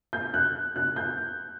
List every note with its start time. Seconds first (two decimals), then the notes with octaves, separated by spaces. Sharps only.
0.13 G6
0.34 F#6
0.76 F#6
0.96 G6